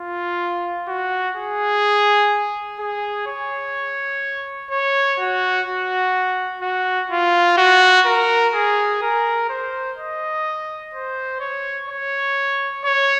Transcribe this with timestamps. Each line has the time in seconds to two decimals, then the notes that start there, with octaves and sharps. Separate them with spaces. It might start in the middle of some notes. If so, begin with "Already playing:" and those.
Already playing: F4
0.88 F#4
1.36 G#4
2.79 G#4
3.27 C#5
4.70 C#5
5.19 F#4
5.67 F#4
6.62 F#4
7.11 F4
7.57 F#4
8.06 A#4
8.54 G#4
9.02 A#4
9.49 C5
9.97 D#5
10.94 C5
11.40 C#5
11.88 C#5
12.84 C#5